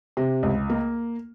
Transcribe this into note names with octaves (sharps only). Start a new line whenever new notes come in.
C3
C#2
A#3